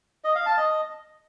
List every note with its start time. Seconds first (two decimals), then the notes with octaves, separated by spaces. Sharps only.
0.24 D#5
0.35 F5
0.46 A5
0.57 D#5